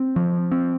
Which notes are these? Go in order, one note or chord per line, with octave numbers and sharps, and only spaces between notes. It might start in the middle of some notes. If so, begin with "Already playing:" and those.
Already playing: C4
F3
C4